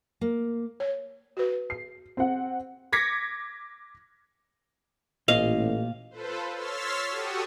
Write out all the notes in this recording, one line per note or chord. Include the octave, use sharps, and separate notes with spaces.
A#3
C#5
F#4 B4
C7
C4 F#5
D6 G#6 A#6 B6 C#7
A1 A#2 D#5 F5
F4 A4 B4 C5
C#5 C6 E6 F6 A6 B6
F#4 G4 A4 C#6 D#6